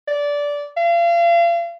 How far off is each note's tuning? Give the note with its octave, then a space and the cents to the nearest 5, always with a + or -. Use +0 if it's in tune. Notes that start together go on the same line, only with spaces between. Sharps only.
D5 -15
F5 -35